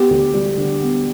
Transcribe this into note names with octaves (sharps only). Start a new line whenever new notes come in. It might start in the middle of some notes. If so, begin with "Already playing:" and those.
Already playing: B3 G4
D2
G3
D3
B3